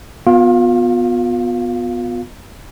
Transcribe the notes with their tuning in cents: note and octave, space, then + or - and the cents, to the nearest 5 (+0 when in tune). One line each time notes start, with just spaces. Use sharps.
B3 +0 F4 +35 F5 +0